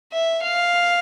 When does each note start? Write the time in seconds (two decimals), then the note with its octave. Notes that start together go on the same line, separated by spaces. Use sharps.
0.13 E5
0.43 F5